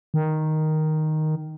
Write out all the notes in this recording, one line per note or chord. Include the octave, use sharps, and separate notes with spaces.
D#3